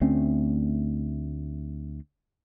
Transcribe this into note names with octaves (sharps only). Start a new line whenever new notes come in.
D2 A3 C4 C#4